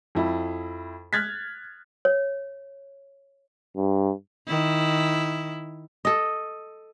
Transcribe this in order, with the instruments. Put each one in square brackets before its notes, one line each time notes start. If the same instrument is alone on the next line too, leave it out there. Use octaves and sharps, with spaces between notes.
[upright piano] F2 E4
F6 F#6 G#6 A6 B6
[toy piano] C#5
[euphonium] G2
[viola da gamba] D#3 E4
[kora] A4 D#5